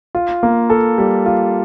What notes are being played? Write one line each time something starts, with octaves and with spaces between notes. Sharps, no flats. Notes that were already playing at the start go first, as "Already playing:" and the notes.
F4
A#3
A4
G3
F4